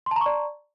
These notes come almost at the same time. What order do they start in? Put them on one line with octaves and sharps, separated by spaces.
C6 A5 A#5 C#6 D5